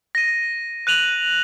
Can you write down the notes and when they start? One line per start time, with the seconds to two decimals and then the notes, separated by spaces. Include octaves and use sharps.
0.15 A#6 D#7
0.87 F#6 D#7 F7 F#7